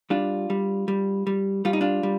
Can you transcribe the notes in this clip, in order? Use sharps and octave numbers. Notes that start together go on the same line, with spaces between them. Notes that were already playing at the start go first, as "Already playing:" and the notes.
G3 D4 F4
G3
G3
G3
G3 F4
D#4
D4 F4
G3